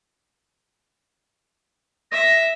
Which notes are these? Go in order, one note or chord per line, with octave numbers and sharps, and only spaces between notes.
E5 A#6